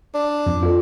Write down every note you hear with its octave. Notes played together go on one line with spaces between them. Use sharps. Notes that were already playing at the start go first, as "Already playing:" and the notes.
D4
F2
F4 A4